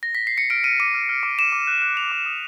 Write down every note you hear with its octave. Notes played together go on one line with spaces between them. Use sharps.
A#6
B6
C7
C#7
F6 D7
F6 D#7
D6 D#7
F6
F6
D6
D6 E7
D6
F#6
F#6
F#6 F7
D6
D#6